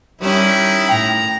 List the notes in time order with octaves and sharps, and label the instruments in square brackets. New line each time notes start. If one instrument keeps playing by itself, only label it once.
[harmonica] D#3 E4 [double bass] G3 [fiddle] C#4
[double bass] A2 [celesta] G5 [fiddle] A#5